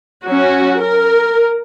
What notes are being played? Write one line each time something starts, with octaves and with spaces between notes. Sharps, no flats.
F#3 C#4 F#4
A#4